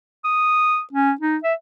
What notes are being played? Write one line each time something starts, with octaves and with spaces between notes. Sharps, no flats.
D#6
C#4
D#4
E5